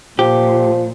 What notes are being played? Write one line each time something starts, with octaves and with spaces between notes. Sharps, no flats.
A#2 F3 G4